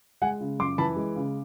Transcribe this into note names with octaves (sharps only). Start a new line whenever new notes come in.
G#3 F#5 G#5
C#3
F#2 C6 D6
E3 A5 B5
G#3
C#3